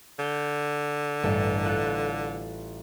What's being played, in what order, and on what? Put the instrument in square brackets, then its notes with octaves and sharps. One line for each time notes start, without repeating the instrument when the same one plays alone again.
[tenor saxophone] D3 [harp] G6
[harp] A1 G2 A4
F4 A4 F#6